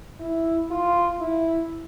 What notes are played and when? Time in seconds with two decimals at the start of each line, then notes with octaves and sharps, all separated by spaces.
0.19 E4
0.71 F4
1.20 E4